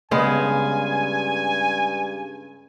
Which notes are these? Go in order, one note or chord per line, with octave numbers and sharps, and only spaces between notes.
G2 C#3 G#3 B3 G#5